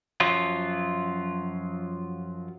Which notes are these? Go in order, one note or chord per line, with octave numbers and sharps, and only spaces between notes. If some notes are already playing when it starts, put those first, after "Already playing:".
F#2 F3 F#3 F4